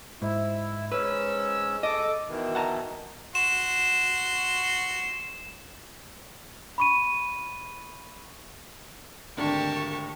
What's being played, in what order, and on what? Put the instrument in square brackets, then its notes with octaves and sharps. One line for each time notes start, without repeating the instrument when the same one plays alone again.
[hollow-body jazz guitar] G#2 [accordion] E4
[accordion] G#2 C#4 E6 [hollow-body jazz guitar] B4
[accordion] A4 D6 [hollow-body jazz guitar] D#5
[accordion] B2 D#3 E3
[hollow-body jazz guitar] F#5 A5 A#5
[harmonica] F#4 C6 [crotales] E7
[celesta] B5 C#6 D#7
[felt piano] G#1 D2 D4 [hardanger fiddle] G4 A5 [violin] A#4 C#6